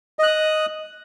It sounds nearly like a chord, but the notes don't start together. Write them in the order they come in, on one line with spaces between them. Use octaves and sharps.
D#5 F#6 D#6